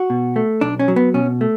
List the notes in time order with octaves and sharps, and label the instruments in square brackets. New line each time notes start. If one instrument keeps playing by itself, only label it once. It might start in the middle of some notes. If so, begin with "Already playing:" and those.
Already playing: [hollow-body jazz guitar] F#4
B2
A3
B1 D4
C#4
F#3
B3
B2 C#4
A3